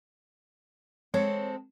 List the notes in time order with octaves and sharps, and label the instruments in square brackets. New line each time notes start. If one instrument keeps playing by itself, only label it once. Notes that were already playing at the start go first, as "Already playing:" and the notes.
[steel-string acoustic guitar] G#3 C4 A4 [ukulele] C#5